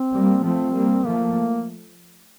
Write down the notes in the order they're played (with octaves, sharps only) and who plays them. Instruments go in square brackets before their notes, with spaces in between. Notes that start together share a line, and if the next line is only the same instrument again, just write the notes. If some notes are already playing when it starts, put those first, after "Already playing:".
Already playing: [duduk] C4
[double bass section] G3 A#3
[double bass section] F3 A3 [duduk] C4
[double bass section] G3 A#3
[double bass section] F3 A3 [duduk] A#3